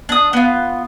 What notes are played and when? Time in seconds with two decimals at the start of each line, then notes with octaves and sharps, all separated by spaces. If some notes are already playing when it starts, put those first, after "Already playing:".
0.09 D4 D#6
0.33 B3 F4